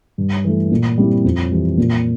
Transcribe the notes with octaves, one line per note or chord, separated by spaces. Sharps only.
G2
E3 A3
A#2
G3 C4 E4
F2
E3 G3
A#2